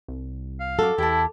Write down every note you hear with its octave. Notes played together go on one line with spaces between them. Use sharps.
C2
F5
F#2 F#4 A4 D6
E2 E4 G4 A5